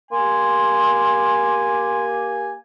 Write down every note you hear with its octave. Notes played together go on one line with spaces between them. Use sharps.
A#3 G4 G#5 C6